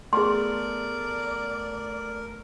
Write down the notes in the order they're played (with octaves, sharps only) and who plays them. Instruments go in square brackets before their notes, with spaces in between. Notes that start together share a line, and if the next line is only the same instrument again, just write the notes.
[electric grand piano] A3 B3 [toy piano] G#4 C6 [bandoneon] A#4 [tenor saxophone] D5